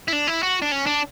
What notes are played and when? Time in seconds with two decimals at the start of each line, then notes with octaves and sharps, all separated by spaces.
0.08 E4
0.13 D4
0.27 E4
0.42 F#4
0.62 D4
0.72 C#4
0.86 D4